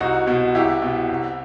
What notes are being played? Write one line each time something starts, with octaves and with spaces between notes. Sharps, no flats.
C2 D#4 F#4
B2
C2 E4 G4
B2
C2